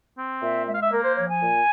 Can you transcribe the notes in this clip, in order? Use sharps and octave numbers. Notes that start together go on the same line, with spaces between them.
C4
A#2 E5
G#3 E5
F5
E5
A#3 A#4
C5
F3 C#5
G#5
A#2